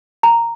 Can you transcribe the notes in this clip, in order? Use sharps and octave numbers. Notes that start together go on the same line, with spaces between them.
A#5